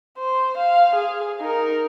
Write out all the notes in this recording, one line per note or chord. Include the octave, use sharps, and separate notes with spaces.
C5
F5
G#4
D#4 A#4